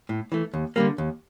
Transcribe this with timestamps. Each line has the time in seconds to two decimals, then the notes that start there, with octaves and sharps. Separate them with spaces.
0.09 A2
0.32 E3 A3
0.54 D#2
0.76 D3 G3 A#3
0.98 D#2